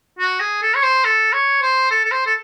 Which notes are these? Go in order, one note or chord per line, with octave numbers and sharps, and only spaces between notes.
F#4
G#4
A4
C#5
C5
A4
C#5
C5
A4
A4
C5
A4